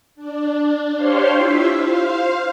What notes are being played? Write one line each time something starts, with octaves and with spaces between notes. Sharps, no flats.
D4
D4 G4 C5 C#5 F5 C6
E4 F4 E5
C5 F5